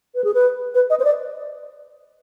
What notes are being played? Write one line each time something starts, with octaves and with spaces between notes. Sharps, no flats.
B4
G#4
B4
B4
D#5
C5
D5